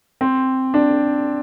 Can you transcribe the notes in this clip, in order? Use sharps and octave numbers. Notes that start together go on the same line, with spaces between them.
C4
D4